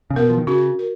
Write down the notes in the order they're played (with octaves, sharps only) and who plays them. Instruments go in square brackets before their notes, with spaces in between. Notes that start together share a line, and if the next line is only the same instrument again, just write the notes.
[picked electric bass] C#3
[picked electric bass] B2 [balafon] A#4
[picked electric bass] F3
D#3
[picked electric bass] C#3 [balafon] F#4
[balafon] A#4